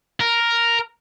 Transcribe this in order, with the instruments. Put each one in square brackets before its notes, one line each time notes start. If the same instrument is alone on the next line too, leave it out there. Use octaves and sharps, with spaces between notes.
[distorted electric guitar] A#4